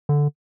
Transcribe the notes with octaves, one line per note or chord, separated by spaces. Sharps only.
D3